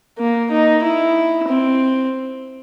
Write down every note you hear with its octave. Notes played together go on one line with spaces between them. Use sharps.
A#3
D#4
E4
C4